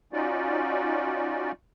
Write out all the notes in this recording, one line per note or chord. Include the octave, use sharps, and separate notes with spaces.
C#4 D#4 F4 F#4 D5